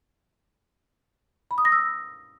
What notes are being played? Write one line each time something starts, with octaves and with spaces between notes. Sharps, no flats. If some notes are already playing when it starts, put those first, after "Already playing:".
B5
D#6
A#6
E6